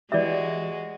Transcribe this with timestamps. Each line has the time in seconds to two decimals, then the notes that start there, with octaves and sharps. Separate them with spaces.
0.12 E3 G#3 F#4 G4 D5 E5